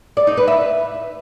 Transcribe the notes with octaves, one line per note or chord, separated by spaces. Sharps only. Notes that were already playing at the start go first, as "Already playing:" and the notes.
D5
D#4
B4
E5